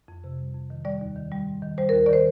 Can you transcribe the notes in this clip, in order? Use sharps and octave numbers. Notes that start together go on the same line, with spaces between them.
F2
C3
G3
F2
D#3
G3 D5
D#2
D#3
G3
G#2
D#3
G3 C5
A#4
D#2
D5
D#3 C5